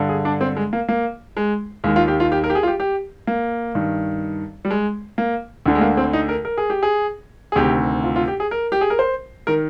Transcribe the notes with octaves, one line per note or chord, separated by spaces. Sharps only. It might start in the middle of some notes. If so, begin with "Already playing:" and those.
Already playing: G2 D3
G#4
D4
C4
G#3
A#3
A#3
G#3
D#2 D#3 G#3
F4
G4
F4
G4
A#4
G4
G#4
F4
G4
G4
A#3
G2 D#3
G3
G#3
A#3
D2 D3
G#3
A#3
C4
D#4
A#4
A#4
G#4
G4
G#4
G#4
D2 C3 D#3 G4
F4
F4
G4
G#4
A#4
G4
G#4
A#4
C5
D#3 A#4